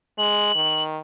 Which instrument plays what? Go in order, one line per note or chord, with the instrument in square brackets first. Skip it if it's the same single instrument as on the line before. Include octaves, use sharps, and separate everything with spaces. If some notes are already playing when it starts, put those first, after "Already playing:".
[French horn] G#3 [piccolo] F#7
[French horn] D#3